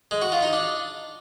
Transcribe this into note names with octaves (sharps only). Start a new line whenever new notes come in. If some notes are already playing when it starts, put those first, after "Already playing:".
G#3
F#4
F4
D#4
D4